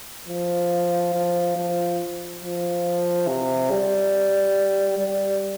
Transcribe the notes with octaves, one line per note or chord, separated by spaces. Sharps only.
F3
F3
F3
F3
C3
G3
G3